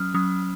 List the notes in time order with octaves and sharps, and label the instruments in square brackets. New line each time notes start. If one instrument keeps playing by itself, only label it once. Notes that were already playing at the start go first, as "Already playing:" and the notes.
Already playing: [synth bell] F#3 C#4 D#6 F6
F#3 C#4 D#6